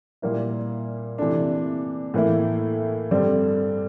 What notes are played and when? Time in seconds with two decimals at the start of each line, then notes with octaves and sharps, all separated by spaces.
0.22 A#2 G3 A#3 E4
1.18 C3 E3 A3 D4
2.14 A2 E3 A#3 E4
3.11 G2 D3 G3 C4